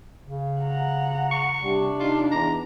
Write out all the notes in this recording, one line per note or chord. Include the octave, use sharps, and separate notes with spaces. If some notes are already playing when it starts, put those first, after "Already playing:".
C#3
F#5 A#5
C#6
C3 G3 D4
D#4 F4
E2 A#5